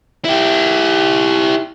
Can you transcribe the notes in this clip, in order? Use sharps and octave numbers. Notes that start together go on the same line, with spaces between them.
E4 G4